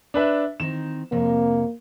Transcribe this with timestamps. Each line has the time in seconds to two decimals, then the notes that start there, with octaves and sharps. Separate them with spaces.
0.14 D4 B4 E5
0.60 D#3 C4 D#4 E7
1.12 F2 C3 A#3 C#5